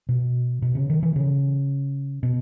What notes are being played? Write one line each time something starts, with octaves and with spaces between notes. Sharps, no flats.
B2
B2
C#3
D#3
E3
C#3
B2